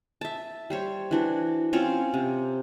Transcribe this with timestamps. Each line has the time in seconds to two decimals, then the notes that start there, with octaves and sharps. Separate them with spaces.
0.21 E5 A5
0.70 G3 C5 C#5
1.11 E3 D4 F#4
1.73 C4 C#4 F4 C#5
2.14 C3